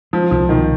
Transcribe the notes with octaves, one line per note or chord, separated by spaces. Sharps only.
F3 G#3
C2 F3
B2 D#3